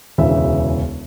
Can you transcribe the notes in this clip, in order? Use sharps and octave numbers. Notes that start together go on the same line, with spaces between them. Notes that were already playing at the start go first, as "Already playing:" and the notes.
E1 D2 C#3 E3 E5